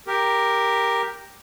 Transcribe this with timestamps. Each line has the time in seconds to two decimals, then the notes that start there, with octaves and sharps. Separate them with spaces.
0.07 G4 A#4